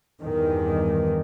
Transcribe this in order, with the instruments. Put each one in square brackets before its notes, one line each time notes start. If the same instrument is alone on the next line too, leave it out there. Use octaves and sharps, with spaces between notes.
[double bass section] E2 G2 D#3